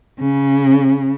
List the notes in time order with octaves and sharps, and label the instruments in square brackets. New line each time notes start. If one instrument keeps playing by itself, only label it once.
[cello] C#3